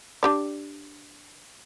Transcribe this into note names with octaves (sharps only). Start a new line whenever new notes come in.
D4 G4 D5